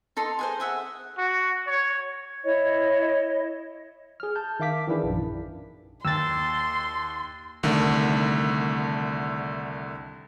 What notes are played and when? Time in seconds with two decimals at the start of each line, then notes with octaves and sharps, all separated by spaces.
0.17 D#4 A4 C6
0.39 G#4 B4 C5
0.60 G#4 E5 F#5
1.18 F#4
1.68 C#5
2.44 E4 C#5 D#5
4.20 G#4 F6
4.36 A5 G6
4.60 D#3 E5 F5 D6 B6
4.88 D#3 E3 D4 E4 G#4
5.04 A#1 F#2
6.05 D#2 A#5 C6 E6 A6
7.63 C2 D3 D#3 A3